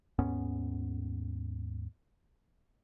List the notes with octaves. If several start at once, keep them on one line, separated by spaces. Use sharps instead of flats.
D#2 G#2 B3 C#4